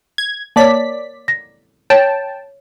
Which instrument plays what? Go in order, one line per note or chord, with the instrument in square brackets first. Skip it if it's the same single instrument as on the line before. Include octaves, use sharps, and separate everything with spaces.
[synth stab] G#6
[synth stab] A#3 D5 B6 [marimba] C#5 A5
[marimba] A#6
[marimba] C#5 [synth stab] G5 A5